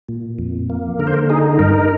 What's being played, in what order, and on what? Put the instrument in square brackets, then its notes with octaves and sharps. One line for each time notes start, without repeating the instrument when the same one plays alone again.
[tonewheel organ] A#2
F2
A#3
D3 A#4
C5
A#4
D#4 G#4
G2 A#4